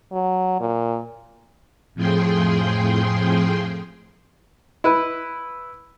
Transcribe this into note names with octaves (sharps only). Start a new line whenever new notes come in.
F#3
A#2
F2 A2 F3 G#4 G5 C6
E4 B4